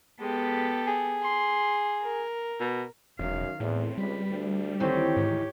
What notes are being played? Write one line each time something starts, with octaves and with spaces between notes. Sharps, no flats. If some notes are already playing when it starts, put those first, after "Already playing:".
G#3 B3 G4 A4
G#4
C6
A#4
B2
E1 F#2 D#3 F5
E2 A2 C4
C#2 G3 B4
D2 D4
D2 D#3 E3 C4 G4 C#5
G#2